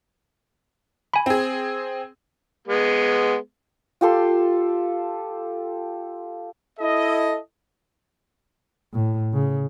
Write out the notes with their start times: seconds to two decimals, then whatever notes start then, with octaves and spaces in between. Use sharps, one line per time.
1.14 G#5 B5
1.26 C4 G#4
2.67 G#3 B3
4.01 F4 G4 A4 C6
6.79 E4 A4 D#5
8.94 A2
9.33 C#3